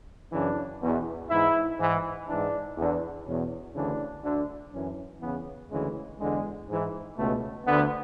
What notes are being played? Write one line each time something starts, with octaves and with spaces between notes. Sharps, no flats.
F#2 C#3 E3 D4
E2 B2
G#2 E3 E4
G#2 E3
G#2 E3 D4
E2 D3
E2 B2 C#4
D2 C#3 E3 D4
D2 D3
F#2 E3 C#4
E2 C#3 E3 B3
D2 C#3 E3 G#3
E2 D3 G#3
G#2 E3
C#2 B2 A3
D2 D3 B3